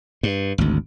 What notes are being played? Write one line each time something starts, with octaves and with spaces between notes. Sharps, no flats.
G2
G#1 D2